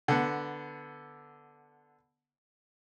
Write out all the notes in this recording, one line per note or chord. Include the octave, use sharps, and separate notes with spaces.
D3 B3